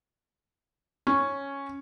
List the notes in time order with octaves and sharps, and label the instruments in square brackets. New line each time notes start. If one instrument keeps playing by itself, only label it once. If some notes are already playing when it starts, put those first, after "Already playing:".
[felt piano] C#4